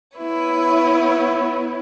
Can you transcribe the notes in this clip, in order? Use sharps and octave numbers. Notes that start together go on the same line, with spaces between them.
B3 E4 B4 C#5